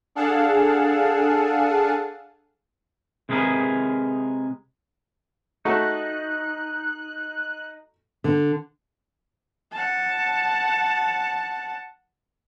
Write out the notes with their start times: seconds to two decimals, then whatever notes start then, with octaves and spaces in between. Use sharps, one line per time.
0.15 D4 G#4 A4 F5 F#5 A5
3.29 C3 G#3 G#4 A#4 B4
5.65 A3 D#4 F#4 A4 F#6
8.24 D3
9.72 F#5 A5